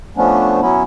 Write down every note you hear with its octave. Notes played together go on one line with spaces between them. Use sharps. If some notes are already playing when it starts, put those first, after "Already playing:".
F3 A3 B3 C#4 D4
F#3 B3 C#4 E4